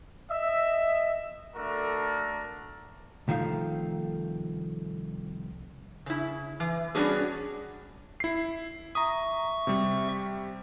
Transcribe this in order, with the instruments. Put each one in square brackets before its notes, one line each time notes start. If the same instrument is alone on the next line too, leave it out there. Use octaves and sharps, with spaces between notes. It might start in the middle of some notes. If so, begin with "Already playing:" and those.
[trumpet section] D#5 E5
A3 D4 F#4 A4 A#4
[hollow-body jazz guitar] C2 D#3 F3 A3 F5
[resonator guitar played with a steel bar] C#3 E4
E3
G3 B3 C#4 D4 F#4 G#4
[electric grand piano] E4 C7
[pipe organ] E5 C#6 [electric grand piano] A#5 D#6
[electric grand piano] C3 G3